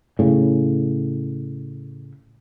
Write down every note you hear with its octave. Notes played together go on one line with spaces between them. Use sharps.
A2 C#3